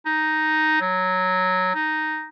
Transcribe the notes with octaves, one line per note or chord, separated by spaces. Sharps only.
D#4
F#3
D#4